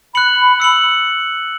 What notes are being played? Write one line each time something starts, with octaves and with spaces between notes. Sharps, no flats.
B5 F#6 C#7 F#7
E6 C#7 F#7